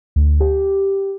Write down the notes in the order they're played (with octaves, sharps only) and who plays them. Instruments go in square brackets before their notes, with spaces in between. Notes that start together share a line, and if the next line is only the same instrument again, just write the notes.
[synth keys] D2
G4